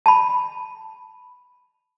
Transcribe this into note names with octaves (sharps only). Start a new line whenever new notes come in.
A5 B5